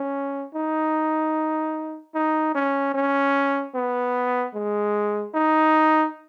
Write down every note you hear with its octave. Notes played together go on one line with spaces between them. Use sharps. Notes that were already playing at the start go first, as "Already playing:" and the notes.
Already playing: C#4
D#4
D#4
C#4
C#4
B3
G#3
D#4